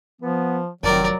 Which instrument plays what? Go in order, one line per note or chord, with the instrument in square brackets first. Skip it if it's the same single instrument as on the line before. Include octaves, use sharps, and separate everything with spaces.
[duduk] F3 [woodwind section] B3
[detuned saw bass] F1 [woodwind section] D#3 [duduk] F#3 [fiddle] A#4 D5